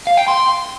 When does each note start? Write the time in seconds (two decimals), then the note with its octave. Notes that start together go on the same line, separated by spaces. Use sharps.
0.07 F5
0.17 G5
0.28 C6